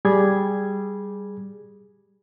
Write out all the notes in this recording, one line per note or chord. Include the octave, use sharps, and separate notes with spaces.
G3 G#4 G#6